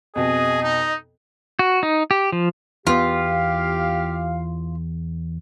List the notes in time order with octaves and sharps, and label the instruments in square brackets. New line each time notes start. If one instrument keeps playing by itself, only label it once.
[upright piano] F2 B2 [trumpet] G#4 [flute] D#5
[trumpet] D#4
[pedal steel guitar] F#4
D#4
G4
F3
[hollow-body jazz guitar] E2 B3 [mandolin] F4 [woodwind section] G4 F5